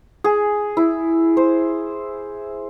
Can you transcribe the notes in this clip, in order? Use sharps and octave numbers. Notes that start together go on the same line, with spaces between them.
G#4
E4
C5